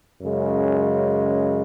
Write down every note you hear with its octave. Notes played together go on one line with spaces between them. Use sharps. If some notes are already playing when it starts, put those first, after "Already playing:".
F#2 C#3 G#3